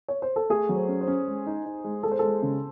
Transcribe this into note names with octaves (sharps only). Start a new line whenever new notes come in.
C#5
C5
A4
A3 G#4
F#3
C5
C#4
C5
C#4
G#3
D#4
D#4
G#3
G#3 A4
C5
G#3 A4
C#3